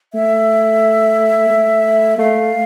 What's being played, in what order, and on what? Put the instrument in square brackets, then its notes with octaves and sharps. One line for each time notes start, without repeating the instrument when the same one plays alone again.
[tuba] A3 [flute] E5
[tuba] A3
[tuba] A3 [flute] F5